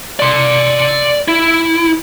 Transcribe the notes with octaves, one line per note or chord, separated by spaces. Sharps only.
D5 C6
E4